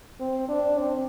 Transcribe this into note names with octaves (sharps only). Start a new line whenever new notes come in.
C4
D4
C4